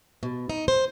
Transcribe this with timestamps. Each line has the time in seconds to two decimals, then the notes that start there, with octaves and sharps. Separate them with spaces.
0.23 B2
0.50 D#4
0.68 C5